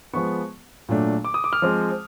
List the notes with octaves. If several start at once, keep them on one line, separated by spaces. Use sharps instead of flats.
F3 G#3 B3 C#6
A#2 F#3 A3 D4
D6
D#6
D6
F6
F3 G#3 C4